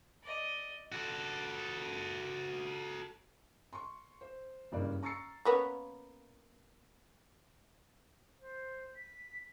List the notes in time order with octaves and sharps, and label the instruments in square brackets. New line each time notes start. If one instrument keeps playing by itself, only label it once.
[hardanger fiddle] D5 D#5
[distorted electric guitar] F#4 A4
[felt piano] C6 C#6
C5
F#1 G2 A#3 D5
A#5 C#6 E6 A6 C7 C#7
[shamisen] A#3 B3 C#4
[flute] C5
B6